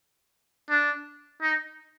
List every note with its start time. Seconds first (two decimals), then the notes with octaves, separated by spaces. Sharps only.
0.70 D4
1.42 D#4